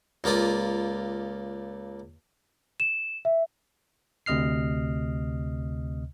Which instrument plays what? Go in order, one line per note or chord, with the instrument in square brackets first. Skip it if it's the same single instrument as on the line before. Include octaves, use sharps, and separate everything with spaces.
[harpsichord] C#2 A#3 F4 D5 D#6
[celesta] E7
E5
[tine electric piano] D2 C3 D#5 F6 C7